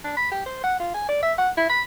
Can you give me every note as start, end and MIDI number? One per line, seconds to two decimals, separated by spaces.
0.04 0.13 62
0.17 0.30 83
0.31 0.43 67
0.46 0.59 72
0.64 0.78 78
0.80 0.90 65
0.94 1.06 80
1.09 1.22 74
1.23 1.33 76
1.38 1.50 78
1.57 1.66 64
1.69 1.82 83